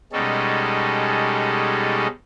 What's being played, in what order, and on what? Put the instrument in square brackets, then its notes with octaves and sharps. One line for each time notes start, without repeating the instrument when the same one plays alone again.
[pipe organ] B2 G3 G#3 C#4 D#4 A4